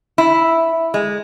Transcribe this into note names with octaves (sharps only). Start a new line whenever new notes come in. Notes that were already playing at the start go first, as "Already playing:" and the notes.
E4
G#3